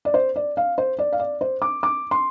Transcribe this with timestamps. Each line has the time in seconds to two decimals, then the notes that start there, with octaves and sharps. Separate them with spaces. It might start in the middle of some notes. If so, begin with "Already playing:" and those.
0.05 D5
0.14 C5
0.36 D5
0.57 F5
0.78 C5
0.99 D5
1.13 F5
1.19 D5
1.41 C5
1.62 D6
1.83 D6
2.11 C6